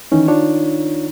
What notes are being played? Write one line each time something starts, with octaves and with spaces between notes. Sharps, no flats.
D#3 E3 C#4 D#4
D4 F4 C#5